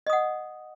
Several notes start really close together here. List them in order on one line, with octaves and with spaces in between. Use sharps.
D#5 D#6 F#5